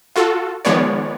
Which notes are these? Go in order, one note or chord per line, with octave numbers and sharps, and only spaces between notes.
F4 F#4 A4
D#3 F3 G#3 B3 C#5 D5